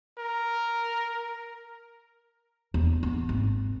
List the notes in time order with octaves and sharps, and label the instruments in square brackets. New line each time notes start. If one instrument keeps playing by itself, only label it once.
[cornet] A#4
[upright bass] E2
B3
G#1